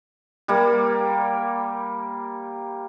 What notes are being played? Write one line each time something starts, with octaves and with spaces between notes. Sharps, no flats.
G3 A#3